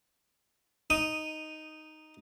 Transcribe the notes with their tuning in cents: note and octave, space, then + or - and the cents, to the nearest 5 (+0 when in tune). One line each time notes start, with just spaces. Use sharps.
D#4 +0 D#6 -5